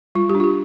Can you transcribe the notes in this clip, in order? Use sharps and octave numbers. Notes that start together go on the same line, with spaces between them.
G3 F4
G4
D4
F4
G4